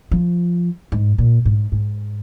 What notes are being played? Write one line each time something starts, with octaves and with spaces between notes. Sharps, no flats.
F3
G#2
A#2
G#2
G#2